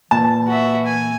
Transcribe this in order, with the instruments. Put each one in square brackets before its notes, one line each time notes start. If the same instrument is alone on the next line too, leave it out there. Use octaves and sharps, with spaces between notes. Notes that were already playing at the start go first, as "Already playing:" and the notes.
[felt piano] A#2 [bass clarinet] E3 [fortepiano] A5
[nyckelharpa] F#4 E5
G#5